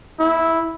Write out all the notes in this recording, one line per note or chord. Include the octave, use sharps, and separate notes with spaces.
E4